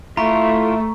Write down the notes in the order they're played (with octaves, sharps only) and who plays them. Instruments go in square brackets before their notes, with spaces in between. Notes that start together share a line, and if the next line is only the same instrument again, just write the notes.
[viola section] A3 [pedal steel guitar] E4 F4 [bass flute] E5 [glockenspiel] A#5 C#6